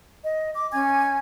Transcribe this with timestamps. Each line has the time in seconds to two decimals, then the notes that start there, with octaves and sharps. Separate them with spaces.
0.25 D#5
0.55 D6
0.72 C#4 G#5 G#6